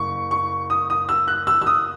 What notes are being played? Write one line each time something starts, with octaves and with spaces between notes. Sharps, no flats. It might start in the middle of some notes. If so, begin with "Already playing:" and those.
Already playing: F#1 C#6
C#6
D#6
D#6
E6
F#6
E6
E6
D#6